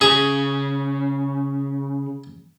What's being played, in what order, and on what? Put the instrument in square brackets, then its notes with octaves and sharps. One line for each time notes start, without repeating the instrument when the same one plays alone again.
[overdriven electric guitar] C#3 [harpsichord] G#4